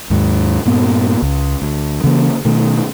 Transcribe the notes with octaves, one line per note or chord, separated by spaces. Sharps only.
D#2 G#2
G2 A#2 B3
C#2
D2
C#3 E3 A#3
B2 D#3 A3